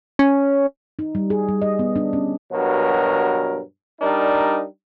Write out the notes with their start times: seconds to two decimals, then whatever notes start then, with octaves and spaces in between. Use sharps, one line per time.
0.19 C#4
0.99 D#4
1.15 G3
1.30 G#4
1.49 G3
1.62 D#5
1.79 B3
1.96 D4
2.13 C#4
2.52 G2 B2 F#3 A#4
4.01 G3 D4 D#4 A#4